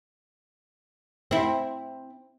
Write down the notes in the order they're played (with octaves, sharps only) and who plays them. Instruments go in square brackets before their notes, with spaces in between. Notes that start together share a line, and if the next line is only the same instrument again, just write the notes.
[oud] C4 E4